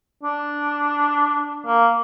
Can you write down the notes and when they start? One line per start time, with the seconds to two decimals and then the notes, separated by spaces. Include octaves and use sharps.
0.23 D4
1.66 A#3